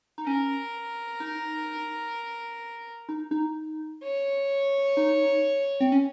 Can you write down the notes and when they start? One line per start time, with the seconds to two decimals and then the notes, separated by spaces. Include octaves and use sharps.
0.18 D#4
0.26 C#4 A#4
1.20 D#4
3.09 D#4
3.31 D#4
4.03 C#5
4.97 D#4
5.80 C4
5.92 C#4